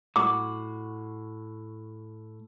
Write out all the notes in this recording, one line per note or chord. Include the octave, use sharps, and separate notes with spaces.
A2 F#4 D6